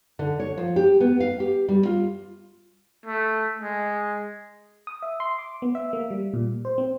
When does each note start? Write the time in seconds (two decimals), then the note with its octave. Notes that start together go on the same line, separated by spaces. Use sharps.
0.19 D3
0.40 C#5
0.58 F3
0.76 G4
1.01 B3
1.20 F5
1.40 G4
1.69 G3
1.85 F4
3.06 A3
3.62 G#3
4.87 D#6
5.02 E5
5.20 C6
5.38 D6
5.62 B3
5.75 E5
5.93 A#3
6.11 G3
6.34 A#2
6.65 C5
6.78 C4